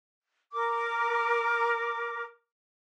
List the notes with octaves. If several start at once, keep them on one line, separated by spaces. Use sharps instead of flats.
A#4 D6